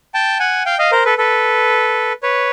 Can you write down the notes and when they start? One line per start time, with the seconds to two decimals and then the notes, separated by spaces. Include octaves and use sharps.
0.14 G5 A5
0.39 F#5 G#5
0.66 F5 G5
0.79 D#5 F5
0.92 A#4 C5
1.05 A4 B4
1.18 A4 B4
2.23 B4 C#5